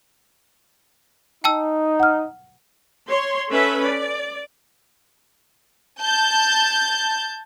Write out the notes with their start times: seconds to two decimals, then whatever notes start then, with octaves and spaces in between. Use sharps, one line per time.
1.44 D#4 G5 A5 E6
2.00 F#5 F6
3.10 C#5 C6
3.50 C#4 A4 B4 E5 B5
3.83 D5
6.01 A5 G6